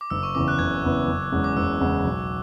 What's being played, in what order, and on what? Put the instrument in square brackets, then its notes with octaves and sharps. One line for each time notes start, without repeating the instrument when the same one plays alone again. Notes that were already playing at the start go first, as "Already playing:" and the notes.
[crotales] D6
[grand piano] F#1 [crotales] E6
[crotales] C#6
[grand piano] E2 C#3 E3 B3 [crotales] D6
[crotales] F#6
[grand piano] F#1 [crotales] G#6
[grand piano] E2 C#3 E3 B3
F#1
E2 C#3 G#3
[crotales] D6
[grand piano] F#1 [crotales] E6
[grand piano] E2 C#3 G#3
B1